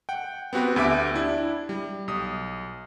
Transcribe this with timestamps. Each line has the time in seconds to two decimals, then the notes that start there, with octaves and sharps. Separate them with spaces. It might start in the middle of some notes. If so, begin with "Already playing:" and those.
0.09 F#5 G5
0.53 B3 C4 F#4 G4 B4
0.76 D2 G4 E5 D6 D7
1.15 D4 E4
1.69 G3
2.08 B1 D#6